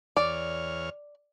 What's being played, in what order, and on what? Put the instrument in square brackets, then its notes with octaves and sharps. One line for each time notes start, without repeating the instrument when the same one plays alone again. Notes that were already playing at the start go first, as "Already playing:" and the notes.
[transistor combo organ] E2 C#5 F6 [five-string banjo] D5